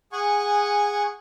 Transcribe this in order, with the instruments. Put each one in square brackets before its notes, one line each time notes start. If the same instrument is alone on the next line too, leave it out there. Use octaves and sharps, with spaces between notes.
[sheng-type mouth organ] G#4 F#5 G#5 C#6